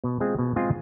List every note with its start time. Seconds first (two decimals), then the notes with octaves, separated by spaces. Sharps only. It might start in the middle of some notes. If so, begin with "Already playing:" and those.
0.04 B2
0.20 G#3 C4 F4 G#4
0.39 B2
0.56 G#3 C4 F4 G#4